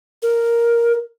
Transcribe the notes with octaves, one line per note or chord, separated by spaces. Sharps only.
A#4